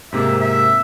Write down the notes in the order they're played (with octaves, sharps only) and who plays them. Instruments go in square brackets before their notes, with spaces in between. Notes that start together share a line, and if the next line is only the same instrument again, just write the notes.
[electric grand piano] G#2 C3 A#3 [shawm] E5
[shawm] E5